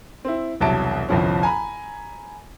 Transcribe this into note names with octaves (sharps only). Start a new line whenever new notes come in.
C4 E4
E1 C2 F#3 E5 A5 D7
G1 C2 F2 F3 C#4
G#5 A#5 B5